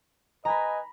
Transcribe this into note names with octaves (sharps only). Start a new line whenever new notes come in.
B4 D#5 G#5 A#5 B5